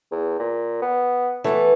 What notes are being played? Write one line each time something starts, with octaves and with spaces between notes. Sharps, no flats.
E2
A#2
B3
E3 A3 B3